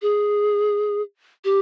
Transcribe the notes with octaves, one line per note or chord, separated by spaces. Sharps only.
G#4
G4